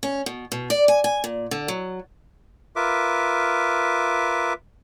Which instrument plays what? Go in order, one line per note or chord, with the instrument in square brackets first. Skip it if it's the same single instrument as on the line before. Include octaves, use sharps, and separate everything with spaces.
[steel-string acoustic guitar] C#4
B2
B2
D5
G#5
G#5
A#2
D3
F#3
[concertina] F4 A#4 B4 E5 D6